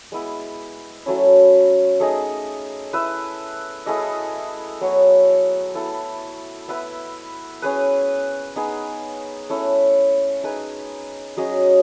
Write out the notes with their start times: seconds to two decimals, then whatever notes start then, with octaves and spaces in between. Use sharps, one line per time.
0.12 G#3 B3 E4
1.06 F#3 A3 C#4 E4
2.00 A3 D#4 G#4 D#5
2.93 E4 B4 E5
3.86 A3 E4 G#4 D#5
4.81 F#3 B3 F#4 C#5
5.74 B3 E4 A4
6.68 B3 E4 B4 E5
7.62 C#4 G#4 B4
8.56 B3 D#4 G#4
9.50 A3 C#4 E4
10.44 D#4 G#4 B4
11.37 F#3 C#4 G#4 D#5